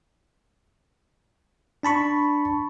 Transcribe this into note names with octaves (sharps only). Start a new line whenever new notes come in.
D4 A5 B5 C#6